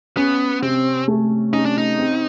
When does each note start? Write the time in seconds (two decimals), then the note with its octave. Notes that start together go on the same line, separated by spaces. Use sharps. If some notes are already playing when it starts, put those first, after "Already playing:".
0.17 B3 C#4
0.62 C3 C4
1.08 A3
1.53 C#4 D#4
1.65 D4
1.78 D#4
1.99 C4